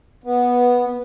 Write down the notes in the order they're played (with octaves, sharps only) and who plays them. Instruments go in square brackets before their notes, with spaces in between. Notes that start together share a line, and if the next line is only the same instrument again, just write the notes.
[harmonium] B3